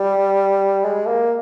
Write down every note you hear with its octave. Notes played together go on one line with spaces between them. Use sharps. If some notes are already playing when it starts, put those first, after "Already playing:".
Already playing: G3
G#3
A#3